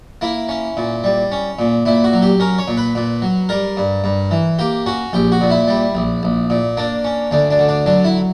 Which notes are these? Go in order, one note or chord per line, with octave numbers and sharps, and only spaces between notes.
A#3 E4
C#4
A#2
G3
C#4
A#2
A#2 E4
F#4
F#3
G4
C#4 A#4
C#5
A#2
B4
A#2
F#3
G3 A#4
G2
G2
E3
A#3 G4
C#4 F#4
A#1 G4
F#4
A#2
E4
G3
A#1
A#1
A#2
A#3 D4
C#4
D2 D4
D4
D3
D4
F#3 D4
E4